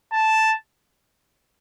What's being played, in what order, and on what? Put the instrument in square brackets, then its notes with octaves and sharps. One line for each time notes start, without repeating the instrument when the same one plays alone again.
[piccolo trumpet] A5